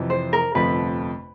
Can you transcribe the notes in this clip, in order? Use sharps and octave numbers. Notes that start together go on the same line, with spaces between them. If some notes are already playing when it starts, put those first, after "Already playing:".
Already playing: F2 C3 E3
C5
A#4
G1 F2 C3 F3 A3 B4